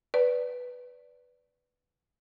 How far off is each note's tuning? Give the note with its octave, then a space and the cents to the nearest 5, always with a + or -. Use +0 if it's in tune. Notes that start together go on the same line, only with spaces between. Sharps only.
B4 +0 D5 -10